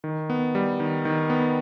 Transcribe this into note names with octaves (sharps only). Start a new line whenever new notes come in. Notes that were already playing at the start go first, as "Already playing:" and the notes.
D#3
B3
G3
D#3
D#3
B3